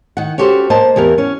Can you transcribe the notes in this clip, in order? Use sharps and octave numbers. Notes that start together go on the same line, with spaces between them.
D#3 F#5
C#4 F#4 G4 A4 C5
A#3 C5 D#5 A5
E2 E3 G4 A#4
C#4